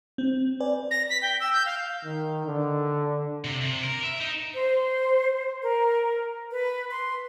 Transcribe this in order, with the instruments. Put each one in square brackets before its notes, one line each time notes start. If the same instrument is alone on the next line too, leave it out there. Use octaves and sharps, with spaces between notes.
[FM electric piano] C4
B4 D5 G#5
[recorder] A#6
B6
G5
E6
G6
F5
[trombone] D#3
D3
[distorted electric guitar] C3
C3
A#4
E5
D#4
[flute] C5
A#4
B4
C6